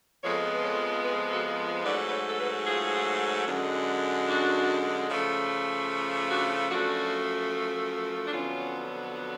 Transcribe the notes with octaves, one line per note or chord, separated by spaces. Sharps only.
F2 F3 G#3 B3 A4 C#5
B4
A4 C#5
G#4 B4
F#4 A4
G#2 F#3 A3 B4 D5
B4
A4 C#5
A4
G#4 B4
F4 G#4
F#2 D3 G#3
D4 F#4
C#3 F3 A3
D4 F#4
F#2 F3 A3 D4 F#4
D4
F2 D3 F#3 B3 C#4 F4